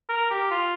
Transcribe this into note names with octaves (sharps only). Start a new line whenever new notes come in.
A#4
G4
F4